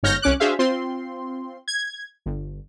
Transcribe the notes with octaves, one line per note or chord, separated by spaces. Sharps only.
G1 G#2 C#5 F6 G6 A#6
C2 C#4 D6 F#6
D4 F#4 G#4 C5 E5 F5
C4 F4 C6
G#6
G1